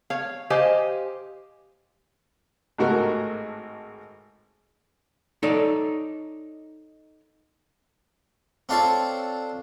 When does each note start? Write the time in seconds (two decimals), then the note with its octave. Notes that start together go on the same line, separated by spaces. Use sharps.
0.10 C#5 F5
0.50 G4 C5 D#5 F5 G#5
2.78 G#1 A2 F#4 A#4
5.43 D#4 A4 C#5 D5
8.69 C4 D4 F4 A4 C5 C#5